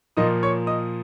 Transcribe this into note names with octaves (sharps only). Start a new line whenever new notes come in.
A#2 F3 A#3 F4 D#5 D#6
C#5 C#6
D#5 D#6